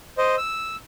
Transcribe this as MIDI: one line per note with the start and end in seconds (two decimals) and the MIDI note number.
0.18 0.36 72
0.18 0.36 75
0.37 0.76 88